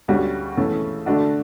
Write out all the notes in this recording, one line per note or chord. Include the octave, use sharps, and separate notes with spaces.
D2 C#3 G3 C#4 F#4
C#3 E3 A3 C#4
D3 A3 D4 F#4